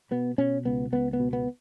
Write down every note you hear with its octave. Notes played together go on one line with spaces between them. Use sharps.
B2 B3
B2 C#4
C#2 B3
C#2 B3
B3
B2
B3